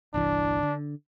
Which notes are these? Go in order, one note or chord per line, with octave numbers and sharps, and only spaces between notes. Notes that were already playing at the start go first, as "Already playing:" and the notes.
G1 C2 E3 D4
D3